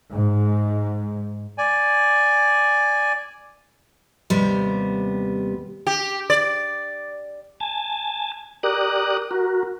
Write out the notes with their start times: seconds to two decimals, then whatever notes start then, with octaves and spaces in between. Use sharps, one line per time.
0.12 G#2
1.58 D5 G#5
4.30 D#2 C3 G3 B3
5.87 G4
6.30 D5
7.60 G#5 A5
8.63 G4 A#4 D5 D#6 F#6
9.31 F#4 A#4